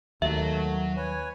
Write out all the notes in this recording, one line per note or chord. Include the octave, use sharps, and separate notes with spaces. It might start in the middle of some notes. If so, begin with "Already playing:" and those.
D#2 F#3 A3 E5
B4 C#5 G#5